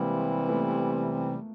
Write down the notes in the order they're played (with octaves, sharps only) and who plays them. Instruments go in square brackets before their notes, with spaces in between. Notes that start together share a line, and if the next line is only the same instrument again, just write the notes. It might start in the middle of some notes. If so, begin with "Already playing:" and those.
Already playing: [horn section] C3 E3 G3 [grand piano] G#3 A#3
[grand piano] A3 B3